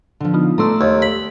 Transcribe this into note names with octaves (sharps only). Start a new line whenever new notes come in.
D3 F3
B3 D#4 F4
A3 D5 A#5 C6 E6
D#2
B5